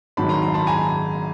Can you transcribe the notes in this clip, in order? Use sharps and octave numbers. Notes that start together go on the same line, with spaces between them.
G#1 G#2 D#3 F#3 A5 B5
A#5 C6
A#5 C6
A5 B5
G#5 A#5